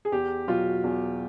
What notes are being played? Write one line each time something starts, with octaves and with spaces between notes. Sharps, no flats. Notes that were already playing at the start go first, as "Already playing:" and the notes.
G#4
E2 G4
B2 F#3 F4
E2